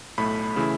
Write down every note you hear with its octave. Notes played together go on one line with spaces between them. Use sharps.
B1 A2 A3 B5
C#3 E3 A3 E4